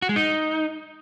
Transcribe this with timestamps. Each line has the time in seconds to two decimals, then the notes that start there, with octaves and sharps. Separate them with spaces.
0.02 F#4
0.09 G#3
0.16 D#4